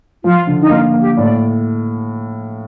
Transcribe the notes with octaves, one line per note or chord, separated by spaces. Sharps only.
F3 F4
D3
D#4
A#3 F4
A#3
G4
A2 D5